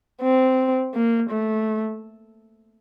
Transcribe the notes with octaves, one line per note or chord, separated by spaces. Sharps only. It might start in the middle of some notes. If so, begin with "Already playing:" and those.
C4
A#3
A3